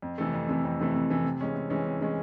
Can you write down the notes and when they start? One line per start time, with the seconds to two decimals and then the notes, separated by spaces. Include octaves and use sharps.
0.02 F2
0.18 C3 E3 A3
0.34 F2
0.48 C3 E3 A3
0.65 F2
0.80 C3 E3 A3
0.94 F2
1.10 C3 E3 A3
1.24 C3
1.41 E3 G#3 C#4
1.55 C3
1.70 E3 G#3 C#4
1.86 C3
2.01 E3 G#3 C#4